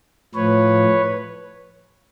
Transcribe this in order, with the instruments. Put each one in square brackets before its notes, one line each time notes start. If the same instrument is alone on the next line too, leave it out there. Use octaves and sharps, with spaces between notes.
[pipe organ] A2 F3 B4 C#5